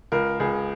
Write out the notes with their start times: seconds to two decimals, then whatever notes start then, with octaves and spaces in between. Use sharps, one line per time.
0.12 C#2 A#4
0.40 C#2 G#4